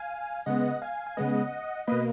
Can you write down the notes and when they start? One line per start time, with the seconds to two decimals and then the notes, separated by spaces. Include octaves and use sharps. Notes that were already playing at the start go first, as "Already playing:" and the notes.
Already playing: F5 G#5
0.46 C#3 G#3 B3 D#5 F#5
0.82 F5 G#5
1.07 G#5
1.17 C#3 G#3 B3 D#5 F#5
1.87 B2 A#3 B4 D#5